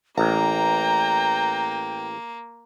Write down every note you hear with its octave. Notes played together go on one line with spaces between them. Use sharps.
A1 A#3 G5 A#5